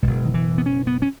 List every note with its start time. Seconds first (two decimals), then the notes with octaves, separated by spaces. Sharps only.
0.02 E2 B2 G#3
0.07 F#1
0.25 D#3
0.34 E3
0.58 B3
0.66 C#4
0.87 B3
1.02 C#4